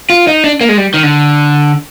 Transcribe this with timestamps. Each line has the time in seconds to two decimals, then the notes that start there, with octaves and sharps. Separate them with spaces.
0.10 F4
0.28 D#4
0.44 D4
0.61 A#3
0.69 G#3
0.77 G3
0.94 D#3
1.03 D3